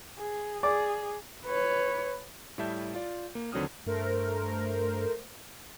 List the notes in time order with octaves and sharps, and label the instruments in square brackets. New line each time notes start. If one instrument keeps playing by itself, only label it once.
[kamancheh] G#4
[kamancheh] G#4 [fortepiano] D5 D6
[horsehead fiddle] B4 C#5
[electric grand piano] A2 G3 E4 E5 A5 G6
F4 D5
A#3
D#2 D3 F#3 C4 D#6 F6
[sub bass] G2 [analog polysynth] A3 A#4 C5